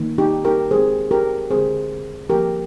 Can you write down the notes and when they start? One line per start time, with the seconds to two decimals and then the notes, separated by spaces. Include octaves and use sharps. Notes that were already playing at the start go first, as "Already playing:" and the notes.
Already playing: D#3 A#3
0.18 D#4 G4
0.45 G4 A#4
0.71 D#3 G#3 C4 G#4 C5
1.11 G4 A#4
1.51 D3 G#3 C4 G#4 C5
2.30 F3 A#3 G4 A#4